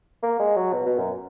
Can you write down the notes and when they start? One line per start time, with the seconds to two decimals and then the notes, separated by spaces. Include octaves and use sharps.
0.23 A#3
0.40 G#3
0.56 F#3
0.73 B2
0.86 B2
0.98 F#2